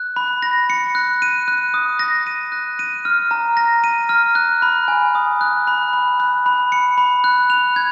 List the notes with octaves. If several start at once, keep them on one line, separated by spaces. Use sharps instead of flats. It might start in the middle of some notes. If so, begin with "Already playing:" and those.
Already playing: F#6
B5
A#6
C#7
F#6
D#7
F#6
D#6
A#6
D#7
F#6
D#7
F6
A#5
A#6
D#7
F6
F#6
B5
G#5
D#6
F#6
B5
B5
F#6
B5
C#7
B5
F#6
F7
G#6